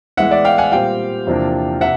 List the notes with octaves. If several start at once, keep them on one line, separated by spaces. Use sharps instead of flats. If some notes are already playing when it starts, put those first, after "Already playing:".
A2 E3 G#3 B3 E5 F#5
D5 E5
F5 G5
F#5 G#5
A#2 G3 C4 F5 G5
E2 C3 F3 A#3 D4
C3 E5 F#5